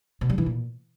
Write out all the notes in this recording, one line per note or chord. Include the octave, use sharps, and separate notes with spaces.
B2
G3
E3
A#2